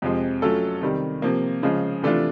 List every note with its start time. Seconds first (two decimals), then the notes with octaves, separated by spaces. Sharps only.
0.02 F2 C3 F3 G#3
0.42 F#3 A3 C#4 F4 A4
0.82 C3 D#3 G3
1.22 C3 F3 A#3
1.63 C#3 F3 G#3
2.02 C3 E3 A3 D4 F4